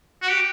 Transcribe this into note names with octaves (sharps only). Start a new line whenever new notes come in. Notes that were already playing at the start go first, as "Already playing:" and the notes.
F#4
G4